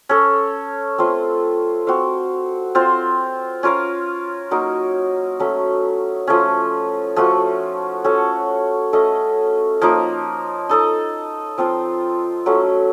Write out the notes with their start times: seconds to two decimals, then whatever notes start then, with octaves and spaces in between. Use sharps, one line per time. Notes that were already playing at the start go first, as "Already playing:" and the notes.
0.09 C#4 A4 C#5
0.98 A3 C4 F4 C5
1.87 C4 F#4 C5 F5
2.75 C4 F4 C5
3.63 C#4 F4 A#4 F5
4.51 F#3 A#3 D#4 A#4
5.40 F#3 A3 C#4
6.27 F3 A3 C#4
7.16 F3 A3 C#4 F#4
8.04 C#4 F#4 A4 C#5
8.93 A3 C#4 A4 D#5
9.81 F3 A#3 D#4 A#4
10.69 D#4 A4 D#5
11.58 F3 C4 F4 C5
12.46 F#3 A3 C#4 A4